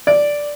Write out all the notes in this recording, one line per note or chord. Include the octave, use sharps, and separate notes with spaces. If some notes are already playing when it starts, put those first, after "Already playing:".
D5